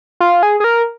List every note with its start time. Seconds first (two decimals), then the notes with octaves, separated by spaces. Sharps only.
0.20 F4
0.43 G#4
0.60 G#4
0.64 A#4